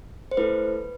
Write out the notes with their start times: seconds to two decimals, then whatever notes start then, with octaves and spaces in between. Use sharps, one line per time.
0.31 C5
0.37 A3 E4 A4 B4